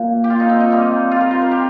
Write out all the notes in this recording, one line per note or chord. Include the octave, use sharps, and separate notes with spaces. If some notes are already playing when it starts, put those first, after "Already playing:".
Already playing: A#2 A#3
G4
F4
D#4
C4
D#4
C3 G3 A#3
F4
A#4
C5
A#4
G4